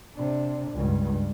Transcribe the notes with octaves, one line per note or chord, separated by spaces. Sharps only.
C3 D4
C#2 G2